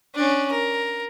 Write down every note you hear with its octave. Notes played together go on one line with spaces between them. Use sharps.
C#4 D4
A#4